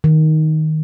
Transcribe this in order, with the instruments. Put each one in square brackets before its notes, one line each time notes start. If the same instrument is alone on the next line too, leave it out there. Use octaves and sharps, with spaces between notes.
[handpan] D#3